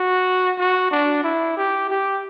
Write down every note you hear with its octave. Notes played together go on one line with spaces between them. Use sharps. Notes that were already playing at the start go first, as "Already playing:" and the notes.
Already playing: F#4
F#4
D4
E4
G4
G4